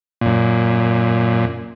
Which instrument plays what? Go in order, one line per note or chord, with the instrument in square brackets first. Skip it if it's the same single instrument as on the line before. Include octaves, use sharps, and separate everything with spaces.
[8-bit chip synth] F#2 A#2